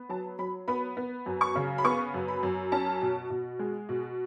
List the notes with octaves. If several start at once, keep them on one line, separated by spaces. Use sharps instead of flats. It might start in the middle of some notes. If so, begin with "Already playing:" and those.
Already playing: B3
F#3 A5
F#3 B5
B3 B5
B3
F#2
C#6
C#3
B5
B3 C#6
F#2
B5
F#2
C#4 A5
B2
B2
G#3
B2